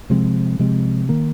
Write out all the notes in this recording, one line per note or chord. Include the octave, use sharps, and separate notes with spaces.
C3 F3 G#3 C4
C3 F3 G#3 C4
D#3 A#3